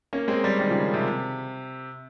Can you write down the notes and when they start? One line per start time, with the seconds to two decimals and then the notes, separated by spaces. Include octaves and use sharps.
0.13 A#3 C#4
0.28 G#3 C4
0.44 G3 A#3
0.59 D#3 G3
0.70 C#3 F3
0.94 C3